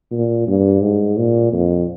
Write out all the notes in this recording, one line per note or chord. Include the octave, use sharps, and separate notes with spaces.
A#2
G2
G#2
A#2
F2